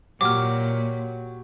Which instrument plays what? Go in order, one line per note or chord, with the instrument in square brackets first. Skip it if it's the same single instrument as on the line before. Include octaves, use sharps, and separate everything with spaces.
[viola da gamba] A#2 [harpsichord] F#3 G4 [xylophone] D6 F6